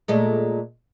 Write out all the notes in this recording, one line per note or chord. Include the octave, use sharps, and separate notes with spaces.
A#2 G#3 A3